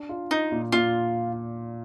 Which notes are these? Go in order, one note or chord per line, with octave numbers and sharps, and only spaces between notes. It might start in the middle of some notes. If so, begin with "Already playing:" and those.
Already playing: D4
F4
D#4 F4
A#2
A#2 F4